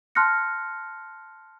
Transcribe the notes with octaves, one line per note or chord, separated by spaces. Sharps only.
A5 C6 F6 F#6 A#6 C#7